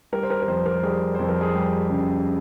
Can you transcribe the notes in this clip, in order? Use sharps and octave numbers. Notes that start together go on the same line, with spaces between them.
G3 A#4
C5
A#4
A#4
F2 C5
A#4
G3 G#4
F2 C5
A#4
G#4
G3 G4
C#3